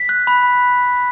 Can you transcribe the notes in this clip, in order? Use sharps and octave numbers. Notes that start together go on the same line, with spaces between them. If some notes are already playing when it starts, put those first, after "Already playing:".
Already playing: B6
F#6
B5